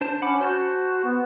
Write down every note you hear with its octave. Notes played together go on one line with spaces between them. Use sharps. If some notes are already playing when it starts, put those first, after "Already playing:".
D4 C5 A5
C#4 F#5 B5 D6
F#4 C5 A5 G6
B3